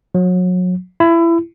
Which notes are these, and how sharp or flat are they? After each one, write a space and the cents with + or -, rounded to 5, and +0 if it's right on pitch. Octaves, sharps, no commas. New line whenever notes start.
F#3 -30
E4 +25